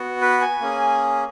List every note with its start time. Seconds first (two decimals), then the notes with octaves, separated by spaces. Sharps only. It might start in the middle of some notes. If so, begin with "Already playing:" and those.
Already playing: B3 F#4
0.21 B4
0.41 G#5
0.61 A#3 C#4 G#4